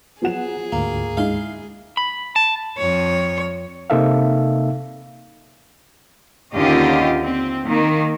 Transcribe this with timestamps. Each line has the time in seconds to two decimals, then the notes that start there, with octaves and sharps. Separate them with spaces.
0.22 F3 F#3 B3 G#4 F#5 E7
0.72 D2 G#2 A#3
1.17 G#3 D#4 E4 F5 C6
1.97 B5
2.36 A5
2.77 F2 C#5
3.90 C3 A#3 D#4 A4 E5 F5
6.55 D#2 D3 C#4 F4 G4 D#5
7.20 C4
7.66 D#3 A#3